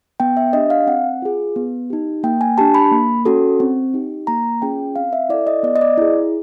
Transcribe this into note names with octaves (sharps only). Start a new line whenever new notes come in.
B3 G5
E5
D4 G4 D#5
F5
C4 F#5
F4 G#4
B3
D#4 G4
A#3 G5
G#5
D4 G4 A5
B5
A#3
C#4 F#4 A4
C4
D#4 G4
A#3 A#5
C#4 F4 G#4 G5
C4 F5
E5
E4 A4 D5
D#5
B3 D5
D#5
D5
E4 G#4